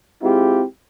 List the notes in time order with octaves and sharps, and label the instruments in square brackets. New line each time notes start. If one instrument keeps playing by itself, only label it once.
[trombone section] G#3 C4 E4 F4 G4